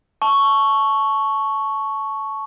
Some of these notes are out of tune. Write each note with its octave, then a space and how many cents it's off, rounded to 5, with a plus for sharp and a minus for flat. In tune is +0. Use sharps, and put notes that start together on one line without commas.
A5 -10 C#6 +0